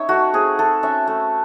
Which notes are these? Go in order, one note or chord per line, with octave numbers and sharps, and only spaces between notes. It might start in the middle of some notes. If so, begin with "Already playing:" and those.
Already playing: C#4 D#4 C#5 E5
A3 F#4
C4 G#4
A3 A4
C#4 E5
A3